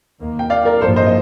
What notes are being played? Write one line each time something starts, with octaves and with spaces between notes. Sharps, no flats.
D#2 D#3 A#3
G5
D5 F5
A#4 D5
A1 G2 F3 A#3 A4 C5
C5 D#5
D#5